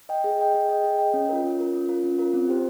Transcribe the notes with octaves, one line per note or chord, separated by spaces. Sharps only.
D#5 G5
G#4
D#5 G5
G#4
D#5 G5
G#4
D#5 G5
C#4
F4 A#4
C#4
F4 A#4
C#4
F4 A#4
C#4
F4 A#4
C4
G4 C5